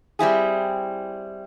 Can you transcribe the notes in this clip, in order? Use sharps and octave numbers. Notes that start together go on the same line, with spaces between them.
G3 C4 E4 G#4